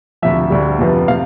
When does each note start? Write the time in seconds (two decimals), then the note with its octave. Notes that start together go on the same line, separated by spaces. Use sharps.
0.22 D2 C3 F3 E5
0.50 D2 D3 G3
0.79 F2 C3 F3 B3
1.08 C3 F5